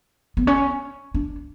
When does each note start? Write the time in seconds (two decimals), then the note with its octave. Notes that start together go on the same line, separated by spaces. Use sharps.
0.37 B3
0.47 C#4
1.14 D4